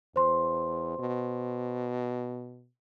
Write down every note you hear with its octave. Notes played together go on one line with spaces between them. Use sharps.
E2 C5 C6
B2